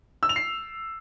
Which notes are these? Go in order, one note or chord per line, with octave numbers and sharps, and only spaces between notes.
E6
F7
C7